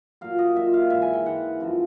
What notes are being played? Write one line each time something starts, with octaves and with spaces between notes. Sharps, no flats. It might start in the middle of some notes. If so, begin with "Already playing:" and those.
A#2 F#3 F5
D#5
A#2 F#3 E5
F5
G#2 E3 E5
G#5
G5
G#2 E3 F#5
F#2 C#3 F3